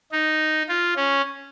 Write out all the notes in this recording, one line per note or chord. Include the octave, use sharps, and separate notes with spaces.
D#4
F4
C#4